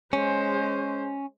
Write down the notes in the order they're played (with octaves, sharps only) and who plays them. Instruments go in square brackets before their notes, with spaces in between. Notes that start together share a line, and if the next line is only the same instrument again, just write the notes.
[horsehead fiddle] G#3 C5 [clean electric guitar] C#4